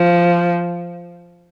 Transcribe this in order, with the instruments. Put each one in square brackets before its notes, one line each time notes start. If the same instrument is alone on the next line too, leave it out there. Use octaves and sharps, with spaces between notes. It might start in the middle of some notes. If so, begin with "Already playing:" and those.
Already playing: [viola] F3